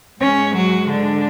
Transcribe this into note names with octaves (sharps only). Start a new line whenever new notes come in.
G#2 G#3 C#4 C#5
F#3 F#4
D3 D4